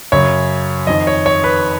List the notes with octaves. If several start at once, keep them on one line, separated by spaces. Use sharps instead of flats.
F#2 C#3 C#5
F2 D#3 D#5
C#5
C#5
B4